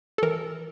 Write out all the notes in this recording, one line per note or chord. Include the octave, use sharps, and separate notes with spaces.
A4
E3 A#4